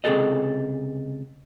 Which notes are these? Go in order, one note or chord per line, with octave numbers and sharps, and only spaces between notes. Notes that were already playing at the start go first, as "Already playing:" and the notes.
C#2 C3 F#3 G#4 A4 D#5